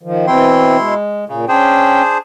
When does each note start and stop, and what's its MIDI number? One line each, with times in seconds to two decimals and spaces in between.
0.03 0.26 51
0.03 0.26 53
0.27 0.94 47
0.27 0.77 52
0.27 0.77 60
0.27 0.94 64
0.27 0.77 79
0.27 0.94 84
0.78 1.25 56
1.29 1.46 46
1.29 1.45 49
1.48 2.02 61
1.48 2.18 62
1.48 2.18 68
1.48 2.18 72
1.48 2.02 79